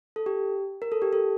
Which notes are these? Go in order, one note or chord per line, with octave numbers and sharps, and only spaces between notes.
A4
G4
A#4
A4
G4
A4